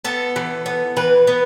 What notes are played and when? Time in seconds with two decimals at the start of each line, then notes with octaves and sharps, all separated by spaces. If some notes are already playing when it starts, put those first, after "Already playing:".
0.05 B3 A4
0.36 E3
0.66 B3
0.96 E3 B4
1.27 B3